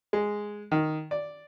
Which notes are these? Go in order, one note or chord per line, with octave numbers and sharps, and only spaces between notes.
G#3
D#3
D5